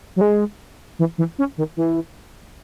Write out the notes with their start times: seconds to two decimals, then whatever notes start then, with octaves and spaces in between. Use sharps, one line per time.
0.16 F#3
0.21 G#3
0.99 E3
1.18 E3
1.39 C#4
1.58 D#3
1.77 E3